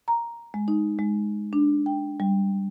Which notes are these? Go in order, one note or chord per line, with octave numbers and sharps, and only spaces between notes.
A#5
G#3
D#4
G#3
D4
G5
G3